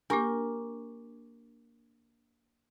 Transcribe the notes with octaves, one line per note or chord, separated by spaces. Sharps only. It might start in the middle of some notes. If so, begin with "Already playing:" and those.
A#3 D4 G4 A#4 C#6 D6